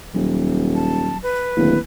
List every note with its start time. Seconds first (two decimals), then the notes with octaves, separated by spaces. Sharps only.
0.15 D#1 F#3
0.75 A5
1.23 B4
1.57 D1 D#3 A#3 E4